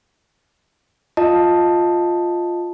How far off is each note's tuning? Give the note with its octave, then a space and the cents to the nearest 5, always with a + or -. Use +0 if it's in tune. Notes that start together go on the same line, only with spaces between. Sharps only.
F4 +0 D#5 +0 A5 +0